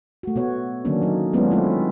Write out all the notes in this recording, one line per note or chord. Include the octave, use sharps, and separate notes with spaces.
A3 F#4
B2 B3 F#4 C#5
D3 D#3 F#3 A#3 C#4 D4
F#3 D#4
F#3 G#3 B3 C#4 D4 F4
F#3 A3 C4 E4 F4